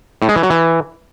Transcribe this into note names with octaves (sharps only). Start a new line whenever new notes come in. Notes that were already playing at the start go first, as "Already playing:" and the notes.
A2
G#3
E3
F#3
E3